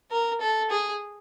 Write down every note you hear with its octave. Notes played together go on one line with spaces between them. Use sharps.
A#4
A4
G#4